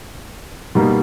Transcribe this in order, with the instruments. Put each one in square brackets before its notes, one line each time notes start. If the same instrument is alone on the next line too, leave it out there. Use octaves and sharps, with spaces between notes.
[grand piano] B2 G3 A#3 D#4